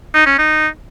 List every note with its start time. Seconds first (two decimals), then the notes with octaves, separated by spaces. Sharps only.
0.14 D#4
0.26 C#4
0.39 D#4